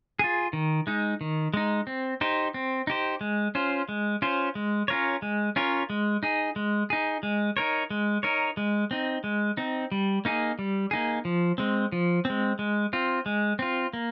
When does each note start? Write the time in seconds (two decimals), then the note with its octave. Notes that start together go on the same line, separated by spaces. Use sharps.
0.19 F4 G#4
0.53 D#3
0.87 G#3 D#4
1.21 D#3
1.54 G#3 D#4
1.87 C4
2.21 D#4 G4 C5
2.54 C4
2.87 D#4 G4 C5
3.21 G#3
3.55 C#4 F4 C5
3.89 G#3
4.22 C#4 F4 C5
4.55 G#3
4.88 C#4 F4 A#4 C#5
5.22 G#3
5.56 C#4 F4 A#4 C#5
5.90 G#3
6.23 D#4 G#4
6.56 G#3
6.90 D#4 G#4
7.23 G#3
7.57 D#4 A#4 C#5
7.90 G#3
8.23 D#4 A#4 C#5
8.57 G#3
8.91 C4 D#4
9.24 G#3
9.57 C4 D#4
9.92 G3
10.25 A#3 D#4 G#4
10.59 G3
10.91 A#3 D#4 G#4
11.25 F3
11.58 G#3 C4
11.92 F3
12.25 G#3 C4
12.59 G#3
12.93 C4 F4
13.26 G#3
13.59 C4 F4
13.93 A#3